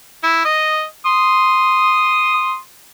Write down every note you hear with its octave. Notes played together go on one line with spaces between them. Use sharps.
E4
D#5
C6 D#6